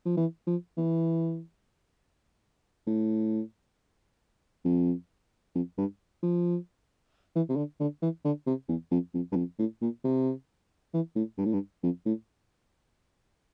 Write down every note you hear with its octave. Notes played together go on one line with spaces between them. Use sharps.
F3
E3
F3
E3
A2
F2
F2
G2
F3
E3
C3
D3
D3
E3
D3
C3
E2
F2
F2
G2
F2
A2
A#2
C3
E3
A2
G2
A2
G2
F2
A2